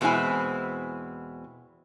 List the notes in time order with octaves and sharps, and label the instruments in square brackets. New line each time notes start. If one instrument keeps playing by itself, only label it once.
[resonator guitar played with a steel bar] E2 B2 G#3 C4 E4 G#5